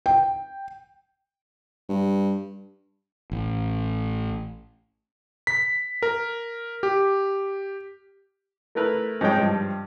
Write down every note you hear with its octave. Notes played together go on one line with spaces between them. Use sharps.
G5
G2
A1
B6
A#4
G4
A3 E4 A#4 B4
G#2 F3 G#3 C#5 G5
G2 F3